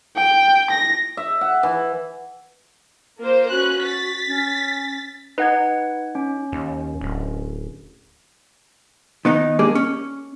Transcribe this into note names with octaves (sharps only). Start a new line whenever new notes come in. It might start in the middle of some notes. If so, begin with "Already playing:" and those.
G5
A#6
E5
F#5
E3
A#3 F4 A#4 C5
C#4 F#4 B4 F#6
A6 B6
C#4
D#4 B4 F#5 G#6
C#4
D#2
D1
D#3 B3 D#4
G#3 A#3 D4 G4 G#4
C#4